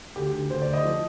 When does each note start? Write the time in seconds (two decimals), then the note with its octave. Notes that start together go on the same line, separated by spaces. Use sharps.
0.16 D2 G4
0.33 D3
0.50 D2 C5
0.62 D5
0.68 D2
0.73 D#5
0.85 F3